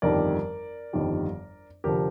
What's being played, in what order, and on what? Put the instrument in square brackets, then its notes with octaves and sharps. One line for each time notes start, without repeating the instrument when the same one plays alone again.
[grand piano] G1 F2 D#3 G3 A#4 D5
G1 F2 D#3 G3
F1 D3 F3 G4 A#4